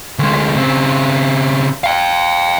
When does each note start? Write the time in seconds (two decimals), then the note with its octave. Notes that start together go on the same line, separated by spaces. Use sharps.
0.19 D2 G#3
0.56 C#3 C4
1.84 F5 G5